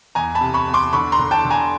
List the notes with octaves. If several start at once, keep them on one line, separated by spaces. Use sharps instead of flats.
E2 G#5 A#5
A5 B5
C3
B5 C#6
E2
C6 D6
D3 B5 C#6
A#5 C6
D3
G5 A5
D3
G#5 A#5